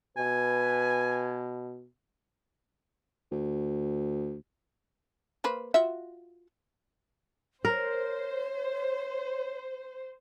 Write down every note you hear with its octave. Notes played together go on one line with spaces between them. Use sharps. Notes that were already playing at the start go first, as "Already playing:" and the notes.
B2 B4 G#5
D2
A#3 B4 C5
F4 F#4 E5
A#4 C5 C#5